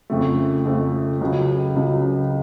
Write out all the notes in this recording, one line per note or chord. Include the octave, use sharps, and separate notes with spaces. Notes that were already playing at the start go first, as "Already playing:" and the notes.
F2 C#3 A3
F2 C#3 A3
C#2 C#3 F#3
C#2 C#3 F#3